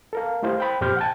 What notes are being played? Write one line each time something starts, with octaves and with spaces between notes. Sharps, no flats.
A4 A#4 F5
A3 E4 G4 C5 F5
C5 G5 B5
F2 A#2 G4 C5 F6 G6
F#5 G5 A5